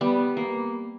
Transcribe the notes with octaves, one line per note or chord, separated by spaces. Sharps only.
G3 B3
A#3